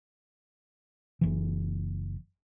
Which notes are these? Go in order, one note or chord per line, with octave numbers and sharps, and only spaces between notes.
F#1 E3